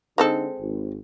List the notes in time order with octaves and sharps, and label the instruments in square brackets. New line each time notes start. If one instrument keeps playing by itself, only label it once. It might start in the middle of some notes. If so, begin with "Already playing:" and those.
[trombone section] D3 D#4 [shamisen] G#3 C4 A4
[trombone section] G#1